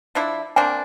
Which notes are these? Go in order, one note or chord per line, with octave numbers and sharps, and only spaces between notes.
F3 D4 E4
A#3 C4 D4 G#5